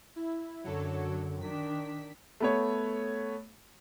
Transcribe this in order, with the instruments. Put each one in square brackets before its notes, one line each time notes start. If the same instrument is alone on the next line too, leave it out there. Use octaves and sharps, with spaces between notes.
[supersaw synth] E4
[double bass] F#2 D3 [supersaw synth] F#3 A4 C#5
[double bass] D#3 D4 [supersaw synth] B6
[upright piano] A3 B3 C#5